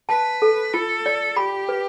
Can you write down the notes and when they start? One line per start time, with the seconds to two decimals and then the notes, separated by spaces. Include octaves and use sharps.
0.09 B4 A5
0.42 A4
0.73 F4 A4
1.06 D5
1.37 G4 B5
1.69 B4